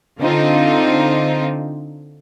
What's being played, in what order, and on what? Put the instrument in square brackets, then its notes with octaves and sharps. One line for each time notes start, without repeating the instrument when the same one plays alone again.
[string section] D3 C4 D#4 F4